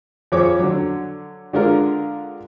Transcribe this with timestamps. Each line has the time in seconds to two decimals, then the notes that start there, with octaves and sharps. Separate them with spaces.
0.32 F2 F3 G#4 C#5 D6
0.59 D3 F#3
1.53 D3 G#3 D4 F4 A#4